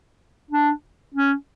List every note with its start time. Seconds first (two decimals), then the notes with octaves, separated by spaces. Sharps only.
0.51 D4
1.14 C#4